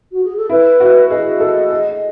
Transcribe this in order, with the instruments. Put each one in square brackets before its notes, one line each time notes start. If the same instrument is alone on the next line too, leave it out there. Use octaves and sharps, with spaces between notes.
[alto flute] F#4
G#4
A4
[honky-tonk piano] E4 [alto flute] B4
[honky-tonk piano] F#4
[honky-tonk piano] G#4 [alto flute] D#5
[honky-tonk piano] A4
G#4